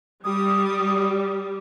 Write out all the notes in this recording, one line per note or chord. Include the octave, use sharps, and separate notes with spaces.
G3 D#6